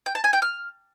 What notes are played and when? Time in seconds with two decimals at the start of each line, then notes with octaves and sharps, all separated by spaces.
0.06 G5
0.15 A5
0.24 G#5
0.33 G5
0.42 F6